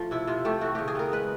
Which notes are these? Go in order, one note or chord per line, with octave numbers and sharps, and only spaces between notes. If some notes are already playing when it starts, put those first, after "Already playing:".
Already playing: F3 A3
C3 E4
C3 F4
A3 G4
E3 F#4
C#3 G4
G#4
B3 A#4
G#3 B4